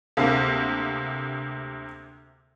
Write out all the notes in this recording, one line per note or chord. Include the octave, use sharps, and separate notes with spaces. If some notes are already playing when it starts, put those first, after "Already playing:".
D2 C3 A#3